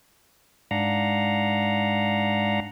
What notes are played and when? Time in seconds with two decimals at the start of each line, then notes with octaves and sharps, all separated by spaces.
0.71 G#2 D4 F5 F#5 A#5